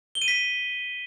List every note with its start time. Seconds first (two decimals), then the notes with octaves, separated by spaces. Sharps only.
0.15 G7
0.22 D#7
0.28 B6